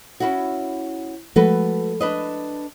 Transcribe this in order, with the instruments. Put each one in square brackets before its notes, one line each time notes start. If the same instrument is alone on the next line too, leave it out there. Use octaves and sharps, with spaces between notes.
[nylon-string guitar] C#4 E4 F#4
[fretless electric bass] F3 G#3 A3 [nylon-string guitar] F#4 A4 B4
[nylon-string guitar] D4 B4 D#5